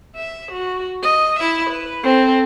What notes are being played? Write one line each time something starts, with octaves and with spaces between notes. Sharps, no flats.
E5
F#4
D#5
E4 E5
B4
C4 A4